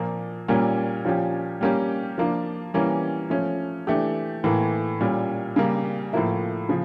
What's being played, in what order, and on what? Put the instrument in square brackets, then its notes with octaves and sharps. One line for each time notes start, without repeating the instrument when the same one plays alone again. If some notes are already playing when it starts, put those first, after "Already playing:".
Already playing: [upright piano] A#2 F3 A#3
A#2 G3 A#3 C#4
A#2 F3 C#4 G4
G3 A#3 C#4 G4
F3 A#3 D4 F4
E3 G3 A#3 C#4
F3 A3 C#4
E3 A3 D4 G4
A2 E3 A#3
A#2 G3 C#4
C#3 G3 A#3
A2 F3 A#3 E4
C#3 F3